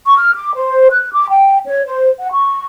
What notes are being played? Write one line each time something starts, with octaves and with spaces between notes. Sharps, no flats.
C#6
F6
D6
C5
F#6
D6
G5
C#5
C5
F#5
C#6